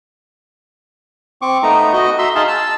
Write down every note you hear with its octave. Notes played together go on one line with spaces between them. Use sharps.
C4 C#6 D6
A3 B3 D#4 A#5
F#4 D#5
E5 A#5 C6 E6
D#4 G#4 F5 A5 C6
A5 E6